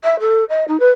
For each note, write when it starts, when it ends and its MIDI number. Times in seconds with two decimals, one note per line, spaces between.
0.04 0.19 76
0.19 0.44 69
0.49 0.64 75
0.67 0.79 63
0.80 0.89 71